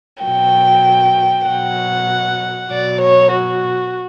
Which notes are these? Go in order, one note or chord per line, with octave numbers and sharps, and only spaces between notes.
B2 F#3 G5
B2 F#3 F#5
B2 F#3 D5
C#5
F#4